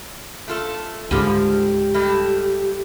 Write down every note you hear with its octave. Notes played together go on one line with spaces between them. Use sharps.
A3 F4 A4
C#2 G#2 D3 F3 G3 G4
G3 A3 D#5